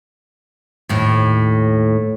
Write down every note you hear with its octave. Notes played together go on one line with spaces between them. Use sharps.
D#2 A2